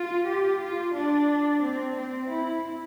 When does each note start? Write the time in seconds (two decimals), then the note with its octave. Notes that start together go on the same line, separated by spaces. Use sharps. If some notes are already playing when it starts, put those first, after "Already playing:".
Already playing: F4
0.26 G4
0.60 F4
0.94 D4
1.62 C4
1.96 C4
2.30 E4